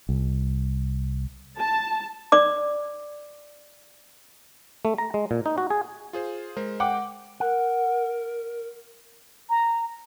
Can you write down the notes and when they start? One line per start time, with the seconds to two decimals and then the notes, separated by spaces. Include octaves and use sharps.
0.09 C2
1.58 A5
2.32 D5 D6
4.85 A3
4.98 A#5
5.14 G#3
5.31 A#2
5.46 D#4
5.58 F#4
5.70 G#4
6.13 F4 G#4 C5
6.57 G#3 A#4 C5
6.80 F#5 G5 D6
7.40 A#4 F#5
9.50 A#5